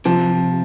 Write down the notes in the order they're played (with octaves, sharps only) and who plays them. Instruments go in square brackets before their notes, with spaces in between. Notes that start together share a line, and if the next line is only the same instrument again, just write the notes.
[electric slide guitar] C3 [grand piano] F3